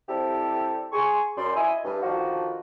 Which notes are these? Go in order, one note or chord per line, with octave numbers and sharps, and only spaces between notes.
C3 G3 C4 E4 G4 A4
G#4 C6 C#6
F#2 D5 C6
E4 D#5 E5 G#5
G2
D3 D#3 F3 F4 F#4